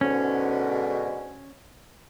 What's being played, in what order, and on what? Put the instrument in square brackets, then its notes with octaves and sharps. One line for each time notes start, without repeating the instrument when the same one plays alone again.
[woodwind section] G#2 B2 D3 [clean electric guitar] C#4